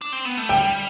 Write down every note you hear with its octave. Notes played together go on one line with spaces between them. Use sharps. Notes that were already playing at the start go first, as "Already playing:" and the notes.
D4
C4
B3
A3
G3 G5